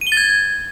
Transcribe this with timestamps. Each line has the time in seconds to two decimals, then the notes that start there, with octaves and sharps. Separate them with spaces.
0.01 D#7
0.07 G7
0.12 A6
0.17 G#6